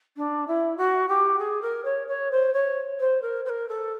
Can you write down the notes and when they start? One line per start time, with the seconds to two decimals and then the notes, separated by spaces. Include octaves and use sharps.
0.17 D4
0.47 E4
0.77 F#4
1.08 G4
1.39 G#4
1.62 A#4
1.84 C#5
2.07 C#5
2.31 C5
2.53 C#5
3.00 C5
3.22 A#4
3.45 C5
3.49 A#4
3.68 A4